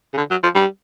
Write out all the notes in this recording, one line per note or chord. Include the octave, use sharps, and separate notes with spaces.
C#3
D3
F#3
F3
G3